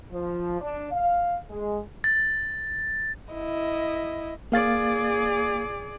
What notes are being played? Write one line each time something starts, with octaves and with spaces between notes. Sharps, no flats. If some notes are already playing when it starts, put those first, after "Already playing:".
F3
D4
F5
G#3
A6
E4 D#5
A#3 G#4 D5 F5 A6